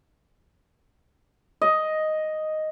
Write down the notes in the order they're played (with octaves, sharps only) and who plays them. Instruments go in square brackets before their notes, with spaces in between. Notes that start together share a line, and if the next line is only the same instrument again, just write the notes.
[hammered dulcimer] D#5